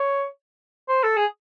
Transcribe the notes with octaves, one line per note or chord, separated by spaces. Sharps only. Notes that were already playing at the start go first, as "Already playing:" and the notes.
Already playing: C#5
C5
A4
G#4